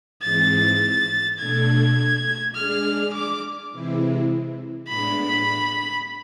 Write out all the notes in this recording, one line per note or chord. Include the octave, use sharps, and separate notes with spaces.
G#2 E3 G#3 C4 A6
B2 A3 D4 A4 G#6
G#3 D4 G#4 D5 F6
D6
C3 E3 G#3 C4 E4
A2 G#3 B3 D4 B5